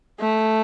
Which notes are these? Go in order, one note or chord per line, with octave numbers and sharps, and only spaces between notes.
A3